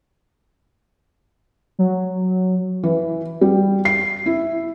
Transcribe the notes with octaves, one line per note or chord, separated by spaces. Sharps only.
F#3
E3
G3
C7
E4